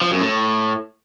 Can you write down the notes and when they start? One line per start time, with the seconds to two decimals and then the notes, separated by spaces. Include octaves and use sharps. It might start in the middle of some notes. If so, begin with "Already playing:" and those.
0.01 F3
0.11 F#2
0.21 A2